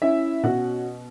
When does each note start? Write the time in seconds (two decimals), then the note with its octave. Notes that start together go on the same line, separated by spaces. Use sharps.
0.02 C#4 E4 E5
0.43 B2 F#4 F#5